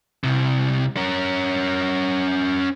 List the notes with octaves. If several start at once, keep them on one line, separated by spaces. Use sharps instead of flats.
C2 C3
C#4 A#4